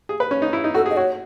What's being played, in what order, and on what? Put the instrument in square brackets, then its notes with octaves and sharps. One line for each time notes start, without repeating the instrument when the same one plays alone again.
[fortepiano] G#4
B4
C#4
D#4
E4
D#4
[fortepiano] F#4 [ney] A4
[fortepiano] G#4
[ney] D#5
[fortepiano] F#4 [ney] C#5